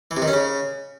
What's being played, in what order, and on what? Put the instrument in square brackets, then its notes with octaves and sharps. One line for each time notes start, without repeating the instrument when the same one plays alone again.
[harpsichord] E3
C3
D#3
C#4
C#3